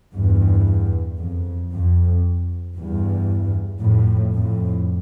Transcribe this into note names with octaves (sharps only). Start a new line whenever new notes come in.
E2 G2
F2
F2
E2 G2
F2 A2
F2 A2